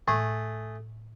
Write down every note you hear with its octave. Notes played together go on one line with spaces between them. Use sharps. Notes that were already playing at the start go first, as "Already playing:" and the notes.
A2 A3 G#4